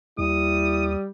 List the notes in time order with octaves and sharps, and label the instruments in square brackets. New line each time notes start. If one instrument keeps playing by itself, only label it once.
[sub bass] D#2 [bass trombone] G3 [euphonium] E4 [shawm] D#6